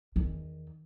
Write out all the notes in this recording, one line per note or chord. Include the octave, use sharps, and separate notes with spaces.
E2 D#3